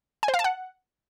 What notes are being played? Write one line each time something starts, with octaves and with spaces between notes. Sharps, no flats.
G#5
C5
F5
A5
F#5